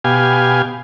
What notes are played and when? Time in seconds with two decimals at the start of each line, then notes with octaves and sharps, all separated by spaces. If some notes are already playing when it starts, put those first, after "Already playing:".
0.04 B2 G4 F5 G#5